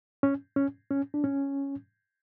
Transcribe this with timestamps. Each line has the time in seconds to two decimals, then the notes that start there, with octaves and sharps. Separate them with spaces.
0.23 C#4
0.56 C#4
0.91 C#4
1.14 D4
1.24 C#4